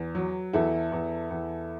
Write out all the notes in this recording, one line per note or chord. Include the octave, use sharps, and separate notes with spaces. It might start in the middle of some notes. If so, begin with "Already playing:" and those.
Already playing: E2
F#3
E2 E4 A4
E2
E2